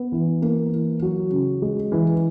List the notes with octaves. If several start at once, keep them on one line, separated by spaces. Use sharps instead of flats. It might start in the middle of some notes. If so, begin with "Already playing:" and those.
Already playing: B3
E3
A#3
E3
F#3
C#3
G#3
E3